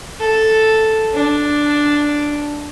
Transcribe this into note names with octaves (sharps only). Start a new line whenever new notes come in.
A4
D4